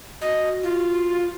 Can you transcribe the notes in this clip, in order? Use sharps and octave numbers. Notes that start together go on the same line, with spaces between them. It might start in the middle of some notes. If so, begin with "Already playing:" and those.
F#4 D#5
F4